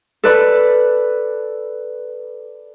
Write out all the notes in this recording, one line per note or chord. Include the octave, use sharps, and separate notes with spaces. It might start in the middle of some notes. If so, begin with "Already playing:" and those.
A4 B4 D5 B5